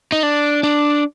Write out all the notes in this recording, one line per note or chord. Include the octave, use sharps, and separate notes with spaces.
D#4
D4
D4